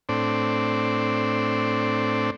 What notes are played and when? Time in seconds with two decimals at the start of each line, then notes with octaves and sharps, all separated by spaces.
0.09 A2 C4 D4